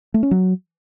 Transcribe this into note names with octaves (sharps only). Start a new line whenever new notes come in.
A3
C#4
F#3